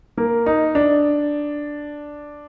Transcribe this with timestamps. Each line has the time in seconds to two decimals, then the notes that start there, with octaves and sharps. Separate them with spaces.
0.17 A#3
0.46 D#4
0.75 D4